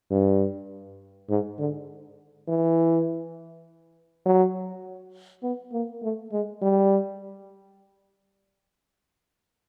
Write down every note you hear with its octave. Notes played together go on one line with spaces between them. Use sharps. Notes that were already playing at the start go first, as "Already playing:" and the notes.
G2
G#2
D3
E3
F#3
B3
A#3
A3
G#3
G3